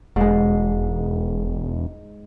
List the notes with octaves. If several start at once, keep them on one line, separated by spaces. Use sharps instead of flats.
E1 G#2 G#3